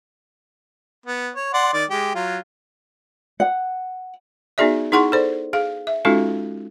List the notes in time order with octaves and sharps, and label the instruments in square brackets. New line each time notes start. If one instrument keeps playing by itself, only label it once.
[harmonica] B3
C#5
D5 F#5 C6
D#3 D5
G#3 G4
F#3 F4
[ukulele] F#5
[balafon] B3 D#4 F#4 G#4 D5 E5
D#4 E4 G#4 F#5 C6 C#6
A4 C5 D5
G#4 F5
E5
G#3 C#4 D#4 F4 F#4 A4